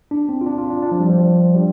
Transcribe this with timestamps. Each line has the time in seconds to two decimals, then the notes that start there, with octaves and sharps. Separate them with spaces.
0.11 D4
0.29 C4
0.41 F4
0.46 D4
0.58 F4
0.70 D4
0.82 D4
0.92 F3
1.00 G3
1.10 F3
1.18 G3
1.54 G3